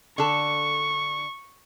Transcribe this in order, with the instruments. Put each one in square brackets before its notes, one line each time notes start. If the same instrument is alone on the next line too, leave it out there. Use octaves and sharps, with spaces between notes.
[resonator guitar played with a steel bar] D3 A4 [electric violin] C#6